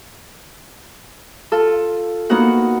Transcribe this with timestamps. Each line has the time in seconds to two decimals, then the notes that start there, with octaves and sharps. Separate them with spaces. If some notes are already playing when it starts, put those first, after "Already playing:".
1.52 F4 A4
2.30 A#3 B3 D#4 F#4 F#5